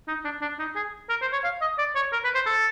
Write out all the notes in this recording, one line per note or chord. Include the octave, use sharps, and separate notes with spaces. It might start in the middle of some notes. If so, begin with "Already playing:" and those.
D#4
D4
D4
D#4
G#4
A#4
C5
C#5
F5
D#5
D5
C#5
A#4
B4
C5
A4